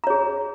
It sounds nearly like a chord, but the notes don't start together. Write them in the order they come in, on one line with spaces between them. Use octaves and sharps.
A#5 C#5 G#4